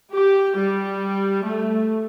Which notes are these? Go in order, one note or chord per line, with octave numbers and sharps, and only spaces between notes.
G4
G3
A3